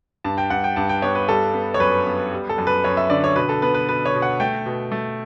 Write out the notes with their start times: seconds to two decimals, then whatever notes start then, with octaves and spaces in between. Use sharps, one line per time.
0.24 G2 A5
0.38 G5
0.50 G2 F#5
0.64 G5
0.76 G2 A5
0.89 G5
1.02 B3 C#5
1.15 B4
1.29 G3 A4
1.54 B3
1.74 C#5
1.80 F#2 B4
2.06 B3
2.32 G3
2.49 A4
2.58 F#2
2.67 B4
2.84 F#2 C#5
2.97 E5
3.10 D3 D5
3.24 C#5
3.36 B2 B4
3.49 A4
3.62 B3 B4
3.75 B4
3.89 B2 B4
4.05 C#5
4.15 B2
4.22 F#5
4.40 A3 G5
4.66 B2
4.92 A3